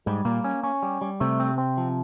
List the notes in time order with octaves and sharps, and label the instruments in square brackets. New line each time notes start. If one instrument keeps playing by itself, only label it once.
[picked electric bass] G#2 [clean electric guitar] G3
[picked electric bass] A#2 [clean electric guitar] A#3
[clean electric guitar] C#4
C#4
G3
G3
[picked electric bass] C3 [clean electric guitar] A3
[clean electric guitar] C4
C4
F3